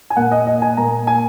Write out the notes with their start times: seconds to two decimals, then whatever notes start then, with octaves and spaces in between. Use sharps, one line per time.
0.10 G#5
0.16 A#2 A#3 F#5
0.32 D#5
0.47 D#5
0.62 G#5
0.77 A#2 A#3 A#5
1.07 G#5